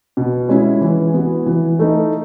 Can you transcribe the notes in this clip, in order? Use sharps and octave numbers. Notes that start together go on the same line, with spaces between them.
B2
G#3 C#4 E4
E3
B3 F#4
E3
A3 D#4